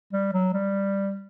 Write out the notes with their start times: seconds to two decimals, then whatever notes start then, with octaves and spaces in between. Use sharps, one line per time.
0.12 G3
0.33 F#3
0.53 G3